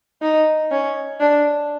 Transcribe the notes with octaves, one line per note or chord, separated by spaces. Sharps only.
D#4
C#4
D4